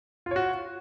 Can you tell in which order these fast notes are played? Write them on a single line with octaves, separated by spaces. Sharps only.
F4 C#5 F#4